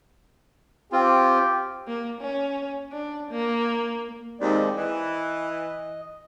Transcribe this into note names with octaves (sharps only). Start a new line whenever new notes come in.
C4 F4 G4
A#3
C#4
D4
A#3
D#2 G#3 C4 D5
E3 D#5